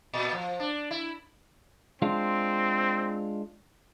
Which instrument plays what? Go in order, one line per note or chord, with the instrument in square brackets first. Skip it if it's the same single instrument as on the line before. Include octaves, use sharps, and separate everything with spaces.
[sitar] A#2
F3
D4
E4
[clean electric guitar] G#3 D4 F4 [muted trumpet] C4